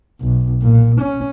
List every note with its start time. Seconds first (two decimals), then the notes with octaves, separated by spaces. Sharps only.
0.21 B1
0.62 A#2
1.01 C#4